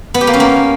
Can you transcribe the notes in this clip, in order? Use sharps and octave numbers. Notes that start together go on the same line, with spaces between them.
B3
G4
A#3
C#4
A#3